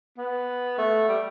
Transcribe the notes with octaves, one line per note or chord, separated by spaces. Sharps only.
B3
A3
G3